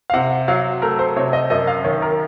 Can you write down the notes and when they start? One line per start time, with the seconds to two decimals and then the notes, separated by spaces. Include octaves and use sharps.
0.10 F5
0.13 C3 F#5
0.48 F#3 F5
0.82 A3 A#4
0.99 C5
1.16 C3 C#5
1.33 D#5
1.50 F#2 D#5
1.67 F5
1.84 D#3 C#5
2.02 A#4